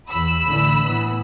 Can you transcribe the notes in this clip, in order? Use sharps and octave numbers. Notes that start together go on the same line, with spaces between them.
E2 B5 E6
A1 D3 E3
A2 E3 B3